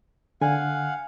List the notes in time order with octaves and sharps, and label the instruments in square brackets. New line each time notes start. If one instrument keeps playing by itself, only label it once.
[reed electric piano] D3 [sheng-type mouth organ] F5 F#5 [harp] G#5